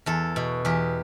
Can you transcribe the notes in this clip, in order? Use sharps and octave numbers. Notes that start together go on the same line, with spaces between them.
E2 A4
B2
E2 G4